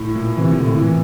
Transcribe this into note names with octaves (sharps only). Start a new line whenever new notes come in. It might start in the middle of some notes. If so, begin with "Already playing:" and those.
Already playing: A2
A#2
C3 E3
A#2
D3
A2
E3